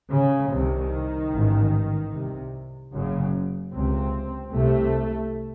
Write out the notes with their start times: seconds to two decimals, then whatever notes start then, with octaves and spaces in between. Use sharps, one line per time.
0.11 C#3
0.51 C2 C3 D#3
1.31 A1 G#2
2.11 C2 C3
2.92 F#1 F#2 C#3
3.72 C#2 C3 C4
4.52 C2 C3 A3